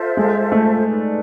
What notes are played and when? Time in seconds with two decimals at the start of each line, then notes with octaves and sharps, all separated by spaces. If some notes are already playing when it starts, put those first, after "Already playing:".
Already playing: F4 A4 C5 E5
0.17 G#3
0.52 A3
0.88 D#4 G#4 B4 D5